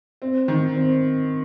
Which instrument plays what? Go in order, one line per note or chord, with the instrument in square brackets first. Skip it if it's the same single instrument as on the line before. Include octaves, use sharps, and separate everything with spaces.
[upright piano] C4
D#3
C4